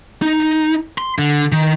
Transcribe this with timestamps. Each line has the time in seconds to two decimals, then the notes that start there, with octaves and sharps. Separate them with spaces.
0.22 D#4
0.98 C6
1.19 D3
1.52 D#3